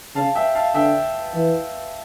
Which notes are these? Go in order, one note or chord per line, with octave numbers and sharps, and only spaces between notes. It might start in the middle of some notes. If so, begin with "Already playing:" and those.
C#3 F5 A5
E5 G5
F5 A5
D3 E5 G5
E3